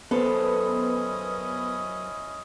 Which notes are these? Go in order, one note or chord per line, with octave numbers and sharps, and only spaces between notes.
F#2 B3 C#4 E4 A4 C5 D#5